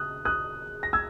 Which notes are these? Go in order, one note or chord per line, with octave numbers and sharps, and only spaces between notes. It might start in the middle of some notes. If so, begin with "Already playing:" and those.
Already playing: C#3 D#6 F#6
D#6 F#6
A#6
E6 G#6